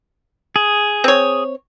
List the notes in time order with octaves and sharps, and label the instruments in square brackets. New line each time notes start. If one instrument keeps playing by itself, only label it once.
[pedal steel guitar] G#4
[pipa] C4 C#5